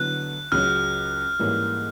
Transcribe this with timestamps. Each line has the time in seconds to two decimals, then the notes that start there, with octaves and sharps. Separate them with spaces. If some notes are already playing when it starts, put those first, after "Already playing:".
Already playing: D3 F#3 B3 E4 F#6
0.52 C#2 C#3 F#3 F6
1.39 G#2 E3 G3 A#3 C#4